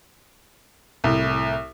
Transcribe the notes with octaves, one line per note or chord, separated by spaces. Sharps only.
C2 A2